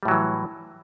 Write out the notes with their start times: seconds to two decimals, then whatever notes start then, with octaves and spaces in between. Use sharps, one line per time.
0.03 G3
0.05 A2
0.08 F#3
0.11 E3